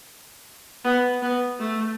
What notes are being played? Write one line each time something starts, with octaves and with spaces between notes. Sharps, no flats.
B3
B3
A3